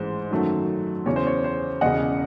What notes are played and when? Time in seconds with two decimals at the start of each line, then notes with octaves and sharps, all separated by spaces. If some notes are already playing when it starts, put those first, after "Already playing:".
Already playing: A1 G#2 E3 G#3 C5
0.31 F#2 D#3 F#3 A3
1.06 E2 C#3 E3 C#5
1.16 C5
1.27 C#5
1.44 C5
1.81 E1 E2 C#3 D#5 F#5